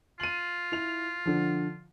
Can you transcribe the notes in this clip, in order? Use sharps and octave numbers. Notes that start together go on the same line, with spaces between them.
F4 D#7 F#7
E4 F7
D3 F3